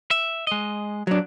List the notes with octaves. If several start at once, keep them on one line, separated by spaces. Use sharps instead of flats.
E5
G#3 D#5
F#3 D4